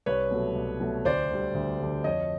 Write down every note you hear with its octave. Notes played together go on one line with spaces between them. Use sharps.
C2 B4 C#5
B2 F#3 A3
C2
B2 F#3 A3
D2 C5 D5
D3 G3
D2
D3 G3
F2 C#5 D#5